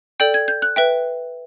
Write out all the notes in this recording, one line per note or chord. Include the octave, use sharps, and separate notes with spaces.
A4 D5 G5 G6
G#6
G6
F#6
B4 E5 G5